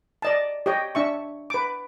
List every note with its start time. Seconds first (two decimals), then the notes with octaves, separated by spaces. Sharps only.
0.22 D5 D#5 A5
0.66 G4 C#5 D#5 G5
0.95 D4 E5 C#6
1.50 B4 D6